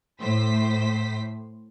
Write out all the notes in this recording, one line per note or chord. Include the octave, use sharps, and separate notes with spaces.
A2 C5 B6